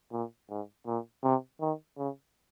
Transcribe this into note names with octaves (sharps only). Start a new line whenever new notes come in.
A#2
G#2
A#2
C3
D#3
C#3